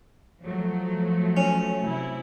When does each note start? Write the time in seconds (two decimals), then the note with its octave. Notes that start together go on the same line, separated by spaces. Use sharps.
0.42 F3 F#3 A3
1.37 C#4
1.85 C3 E4